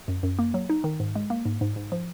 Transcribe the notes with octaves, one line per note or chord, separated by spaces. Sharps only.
F#2
F#2
A#3
F#3
D#4
D#3
G#2
G#3
A#3
G#2
G#2
G#2
F3